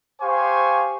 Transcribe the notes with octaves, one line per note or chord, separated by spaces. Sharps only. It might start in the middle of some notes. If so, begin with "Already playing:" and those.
G4 C5 F5 G#5 C#6